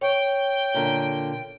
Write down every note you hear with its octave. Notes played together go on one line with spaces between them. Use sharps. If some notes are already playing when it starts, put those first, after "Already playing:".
C#5 G5
A#2 D3